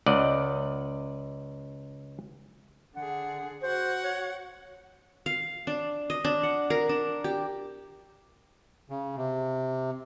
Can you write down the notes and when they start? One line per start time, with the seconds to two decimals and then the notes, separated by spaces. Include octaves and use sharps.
0.06 C#2 D5 D#5 F#5
2.96 D3 G#4 F#5
3.62 F#4 C5 F#5
4.03 C#5
5.26 F5
5.67 D4
6.10 D#5
6.25 D4
6.43 F#5
6.70 A#4
6.89 D4
7.24 G4
8.89 C#3
9.17 C3